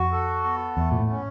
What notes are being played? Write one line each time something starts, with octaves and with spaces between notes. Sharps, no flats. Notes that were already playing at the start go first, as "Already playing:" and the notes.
Already playing: F2 F#4
A4
B3
E2 A3
A#2
A2
C#4